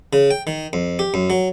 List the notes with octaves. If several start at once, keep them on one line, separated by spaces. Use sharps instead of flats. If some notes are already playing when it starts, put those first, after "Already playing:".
C#3
G5
D#3
F2
G4
F#2
F#3